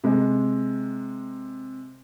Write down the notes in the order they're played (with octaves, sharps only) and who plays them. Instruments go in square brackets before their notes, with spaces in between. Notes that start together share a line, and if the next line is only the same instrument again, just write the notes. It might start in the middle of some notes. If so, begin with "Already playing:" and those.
[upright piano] C3 G#3